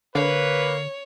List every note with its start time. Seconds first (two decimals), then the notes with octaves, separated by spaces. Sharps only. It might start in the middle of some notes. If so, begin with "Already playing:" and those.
0.15 D3 A#3 B4 C#5